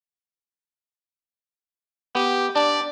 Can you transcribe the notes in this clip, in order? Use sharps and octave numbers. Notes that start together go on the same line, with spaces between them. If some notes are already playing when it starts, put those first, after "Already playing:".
B3 G4
D4 D5